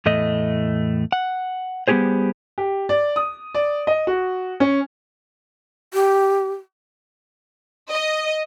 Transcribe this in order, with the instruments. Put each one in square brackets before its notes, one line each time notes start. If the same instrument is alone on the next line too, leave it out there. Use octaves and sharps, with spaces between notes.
[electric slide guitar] E2 A2 A3 D#5
F#5
G3 B3 C#4 G4 G#4 C5
[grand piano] G4
D5
D#6
D5
D#5
F#4
C#4
[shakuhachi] G4
[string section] D#5